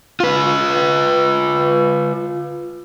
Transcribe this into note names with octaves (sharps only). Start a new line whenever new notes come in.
F4 B4